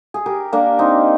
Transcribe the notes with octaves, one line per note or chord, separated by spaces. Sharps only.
G#4
G4 A#4
A#3 D4
C4 D#4